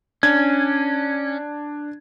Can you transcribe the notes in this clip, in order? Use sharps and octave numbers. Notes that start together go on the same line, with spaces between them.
C#4 D4 G#6